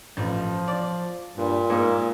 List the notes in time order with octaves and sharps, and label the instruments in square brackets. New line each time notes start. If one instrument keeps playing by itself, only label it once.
[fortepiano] A1 [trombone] F3
[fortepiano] D5
[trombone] G2 [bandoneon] A#2
[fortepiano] G#2 [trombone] A#3